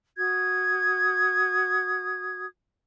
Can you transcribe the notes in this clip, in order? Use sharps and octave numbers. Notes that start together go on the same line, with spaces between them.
F#4 D#6 G#6